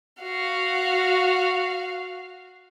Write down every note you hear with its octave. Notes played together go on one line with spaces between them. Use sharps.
F#4 F5